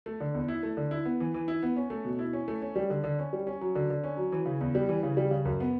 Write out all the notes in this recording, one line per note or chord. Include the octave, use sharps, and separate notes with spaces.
A3
D3
E2
E4
A3
D3
E4
B3
E3
E3
E4
B3
C#4
A3
B2
E4
C#4
A3
C#4
G3
D3
D3
C#4
G3
C#4
F#3
D3
D3
C#4
F#3
E3
C#3
E2
G3
E3
C#3
G3
C#3
F#2
B3